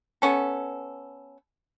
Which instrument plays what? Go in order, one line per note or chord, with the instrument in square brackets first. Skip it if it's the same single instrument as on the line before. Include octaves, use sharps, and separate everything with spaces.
[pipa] B3 C#4 A4